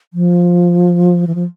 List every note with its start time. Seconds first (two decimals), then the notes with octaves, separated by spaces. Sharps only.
0.14 F3
1.27 E3
1.35 F3